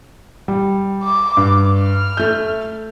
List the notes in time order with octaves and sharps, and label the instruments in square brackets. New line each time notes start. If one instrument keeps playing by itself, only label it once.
[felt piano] G3
[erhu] D6
[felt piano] G2
[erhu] F6
[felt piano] A3 G6